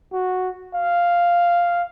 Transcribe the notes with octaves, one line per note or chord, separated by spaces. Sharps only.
F#4
F5